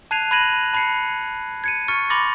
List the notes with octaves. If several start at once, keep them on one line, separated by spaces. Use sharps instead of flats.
A5 F#6 G#6 C7 D#7 F7
B5 F#6 G#6 A#6 D#7 F#7
A5 B5 G#6 C7 C#7
G#6 C#7 D#7
C#6 F6 A6 C#7
B5 C6 D6 A6 A#6